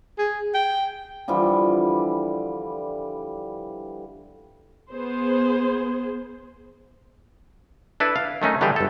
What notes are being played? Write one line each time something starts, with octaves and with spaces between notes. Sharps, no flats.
G#4
G5
D3 E3 F3 G3
B3 G#4 C5
D4 E4 A4 B4
F5
D#3 A3 C#4 D#4
D3 E3 G3 D4 G4 G#4
G1 A4